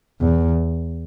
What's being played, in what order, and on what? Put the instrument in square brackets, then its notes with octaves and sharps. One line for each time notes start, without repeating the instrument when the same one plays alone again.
[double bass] E2